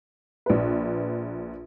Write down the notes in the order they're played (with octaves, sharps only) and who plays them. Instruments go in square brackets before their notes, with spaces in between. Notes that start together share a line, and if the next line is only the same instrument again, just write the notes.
[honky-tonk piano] A#1 B4